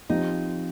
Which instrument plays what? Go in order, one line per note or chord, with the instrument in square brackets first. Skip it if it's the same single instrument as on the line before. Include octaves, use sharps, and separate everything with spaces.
[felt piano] F3 C4 G4 [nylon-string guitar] D#4